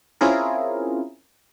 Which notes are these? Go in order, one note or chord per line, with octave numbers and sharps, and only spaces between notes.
C4 C#4 E4 F4 G#4 A#4